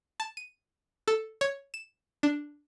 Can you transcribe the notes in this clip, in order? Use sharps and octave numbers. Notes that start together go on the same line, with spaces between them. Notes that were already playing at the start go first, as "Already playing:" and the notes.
A5
D#7
A4
C#5
E7
D4